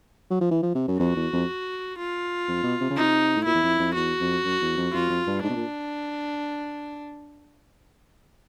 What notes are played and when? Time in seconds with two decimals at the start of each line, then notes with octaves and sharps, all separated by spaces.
0.30 F#3
0.41 F3
0.51 E3
0.62 F3
0.75 C3
0.88 F#2
0.99 F2 F#4
1.16 E2
1.33 F2
1.99 F4
2.48 F2
2.63 B2
2.80 C3
2.90 C#3
2.96 C3 D#4
3.36 A2
3.45 A#2 E4
3.54 E2
3.63 F2
3.79 F2
3.95 E2 F#4
4.20 F2
4.44 F#2
4.61 E2
4.77 F2
4.93 F2 F4
5.09 F2
5.27 G2
5.43 G#2 D4
5.50 B2
5.56 A#2